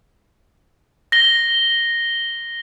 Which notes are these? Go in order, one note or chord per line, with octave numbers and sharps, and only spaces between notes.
A#6 G7